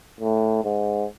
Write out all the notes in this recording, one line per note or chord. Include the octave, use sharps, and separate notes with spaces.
A2
G#2